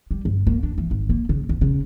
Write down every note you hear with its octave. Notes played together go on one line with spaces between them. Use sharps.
G3
G1
A#3
D4
E3
G#1
A#3
C#3
D2
C#3